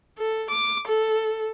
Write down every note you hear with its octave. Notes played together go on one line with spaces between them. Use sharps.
A4
D6
A4